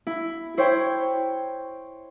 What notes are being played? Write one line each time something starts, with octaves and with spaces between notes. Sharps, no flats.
E4
E4 C5 C#5 G5